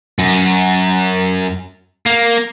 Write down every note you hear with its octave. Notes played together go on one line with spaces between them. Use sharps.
F#2
A#3